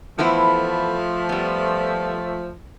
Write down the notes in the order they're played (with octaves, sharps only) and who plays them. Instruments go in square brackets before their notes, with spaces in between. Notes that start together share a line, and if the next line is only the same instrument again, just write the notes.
[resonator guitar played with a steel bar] E3 B3 E4 [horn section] F3 A3
[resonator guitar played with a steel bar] G3 B3